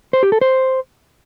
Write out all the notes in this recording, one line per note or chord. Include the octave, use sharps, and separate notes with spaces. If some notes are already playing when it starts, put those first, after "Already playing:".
C5
G4
A4
C5